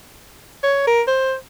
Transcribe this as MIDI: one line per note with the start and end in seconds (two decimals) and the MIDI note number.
0.63 0.83 73
0.87 1.02 70
1.07 1.34 72